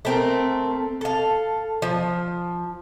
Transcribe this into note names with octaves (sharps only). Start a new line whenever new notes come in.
A3 C4 A#4
A4 F5
F3